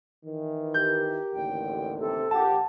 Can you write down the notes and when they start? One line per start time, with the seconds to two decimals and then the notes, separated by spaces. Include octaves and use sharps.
0.24 D#3 E3
0.74 G4 A#4 G6
1.33 A1 D#2 D3 G5
2.00 C3 A4
2.31 A#1 G4 F#5 A5